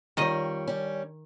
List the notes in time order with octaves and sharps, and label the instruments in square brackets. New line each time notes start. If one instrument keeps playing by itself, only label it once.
[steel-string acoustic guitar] F2 G3 C#5 [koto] D#3 D#5
[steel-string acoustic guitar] G3 C#4